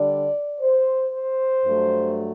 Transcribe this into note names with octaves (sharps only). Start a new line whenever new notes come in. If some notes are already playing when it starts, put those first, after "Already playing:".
Already playing: D3 G3 D4 D5
C5
C5
G2 F#3 A3